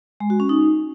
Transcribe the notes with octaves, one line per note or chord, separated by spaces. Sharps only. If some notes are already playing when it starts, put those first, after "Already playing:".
G#3
F#4
C#4
D#4